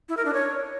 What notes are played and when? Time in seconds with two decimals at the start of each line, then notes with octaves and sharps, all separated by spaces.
0.09 E4
0.17 A#4
0.25 D4
0.34 C#5